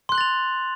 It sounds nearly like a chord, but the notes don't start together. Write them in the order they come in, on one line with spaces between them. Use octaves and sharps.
C6 F#6 F#7 A6 F7